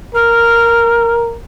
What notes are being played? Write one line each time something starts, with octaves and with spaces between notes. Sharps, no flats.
A#4 F6